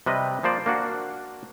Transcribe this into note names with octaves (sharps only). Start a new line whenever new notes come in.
C3 G3 B4 D#5
F3 A#3 C5 D5
A#3 D4 F#4